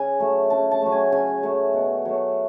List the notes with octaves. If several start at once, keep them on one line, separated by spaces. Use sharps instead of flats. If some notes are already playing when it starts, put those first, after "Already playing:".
Already playing: C#3 G#5
F#3 A3
C#3 A5
A5
F#3 A3
G#5
C#3 G#5
F#3 A3
B2
F#3 A3